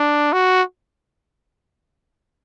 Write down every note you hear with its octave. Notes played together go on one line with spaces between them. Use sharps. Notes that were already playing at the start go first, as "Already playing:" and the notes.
Already playing: D4
F#4